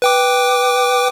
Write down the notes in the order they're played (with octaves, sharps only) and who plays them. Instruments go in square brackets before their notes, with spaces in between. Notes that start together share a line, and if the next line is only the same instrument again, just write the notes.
[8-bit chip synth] B4 G5 D6